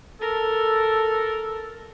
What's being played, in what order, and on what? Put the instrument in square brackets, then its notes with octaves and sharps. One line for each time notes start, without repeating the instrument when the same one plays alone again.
[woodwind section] A4 [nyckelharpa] A#4